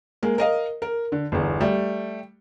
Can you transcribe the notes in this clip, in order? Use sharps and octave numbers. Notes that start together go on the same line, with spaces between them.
G#3 A#3
A#4 D#5 F5
A#4
D3
G1 E2
G3 A3